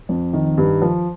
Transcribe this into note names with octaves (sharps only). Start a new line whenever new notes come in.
F2
D#3
G2
F3